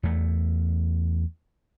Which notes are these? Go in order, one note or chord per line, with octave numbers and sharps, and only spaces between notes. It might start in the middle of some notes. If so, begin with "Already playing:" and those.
E2 A3